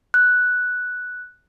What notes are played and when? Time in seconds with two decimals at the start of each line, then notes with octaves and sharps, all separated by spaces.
0.14 F#6